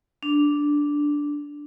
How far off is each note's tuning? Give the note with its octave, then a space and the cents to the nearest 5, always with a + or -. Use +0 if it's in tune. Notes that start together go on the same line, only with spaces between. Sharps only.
D4 -5